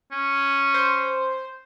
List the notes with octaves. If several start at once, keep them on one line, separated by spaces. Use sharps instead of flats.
C#4
C5